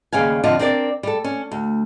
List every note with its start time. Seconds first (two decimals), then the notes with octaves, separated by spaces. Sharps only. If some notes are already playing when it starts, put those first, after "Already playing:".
0.13 D#2 C#3 G3 F5 G#5
0.44 F2 D3 D4 F4 D#5 E5
0.59 C4 D4 E4 A#4 D5
1.03 G3 A4
1.24 C#4
1.51 D2